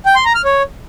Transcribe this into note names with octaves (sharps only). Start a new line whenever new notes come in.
G5
C6
A#5
F6
C#5